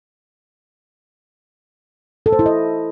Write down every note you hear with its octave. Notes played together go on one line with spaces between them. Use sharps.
A4
C5
E4
D#5